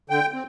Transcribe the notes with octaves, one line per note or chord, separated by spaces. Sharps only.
D3 G5
C4